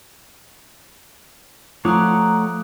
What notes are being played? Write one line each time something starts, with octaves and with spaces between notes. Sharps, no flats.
F3 A3 C#5 F#5 A#5 D6 D#6 F#6